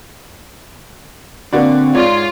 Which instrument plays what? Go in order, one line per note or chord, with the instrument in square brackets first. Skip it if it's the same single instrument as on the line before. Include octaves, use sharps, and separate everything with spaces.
[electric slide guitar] D3 [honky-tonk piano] A#3 F#4 D5 [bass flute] C4
[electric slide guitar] G#2 [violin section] F4 [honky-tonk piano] C#5 D5